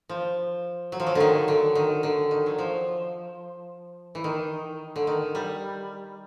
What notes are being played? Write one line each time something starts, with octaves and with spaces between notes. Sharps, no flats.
F3
F#3
F3
F#3
D3 D#3
D3
D#3
D3
D#3
F#3
F3
E3
D#3
D3
D#3
G3